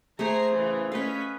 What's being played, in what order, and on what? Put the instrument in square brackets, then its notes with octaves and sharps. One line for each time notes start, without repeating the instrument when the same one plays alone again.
[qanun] A3 G#4 C5 [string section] G#5 A#5 C7
[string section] C#3 E3
[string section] A3 C#4 B6 [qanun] B4 D#5 F5